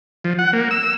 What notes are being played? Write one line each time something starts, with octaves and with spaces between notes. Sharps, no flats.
F3
F#5
A#3
E6